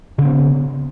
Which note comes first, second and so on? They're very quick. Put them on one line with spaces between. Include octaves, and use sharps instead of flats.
C#3 C4 B3